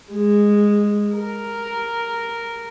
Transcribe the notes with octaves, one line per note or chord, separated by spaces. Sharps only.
G#3
A#4